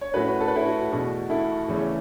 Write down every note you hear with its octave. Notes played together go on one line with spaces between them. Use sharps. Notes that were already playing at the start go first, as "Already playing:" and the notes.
C#5
A2 A3 C#4 F#4 B4
A4
B4
E4 A4
F#4
E2 B2 A3 F#4
E4 A4
E2 C#3 E3 A3 C#4